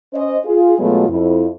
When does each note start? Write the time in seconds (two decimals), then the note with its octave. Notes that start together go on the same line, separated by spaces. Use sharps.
0.14 C#4 C5 D#5
0.45 F4 G#4
0.79 B2 F#3 G#3 A3 B3 F4
1.09 F2 E4